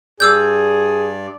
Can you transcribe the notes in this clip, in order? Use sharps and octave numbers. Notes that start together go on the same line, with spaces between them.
G2 G#4 D5 D6 E6 G6